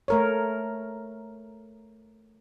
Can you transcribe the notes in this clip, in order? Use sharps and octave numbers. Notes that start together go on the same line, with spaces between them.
A3 A#4 C#5